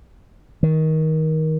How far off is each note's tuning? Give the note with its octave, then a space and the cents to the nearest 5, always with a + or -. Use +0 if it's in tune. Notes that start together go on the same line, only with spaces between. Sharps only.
D#3 +20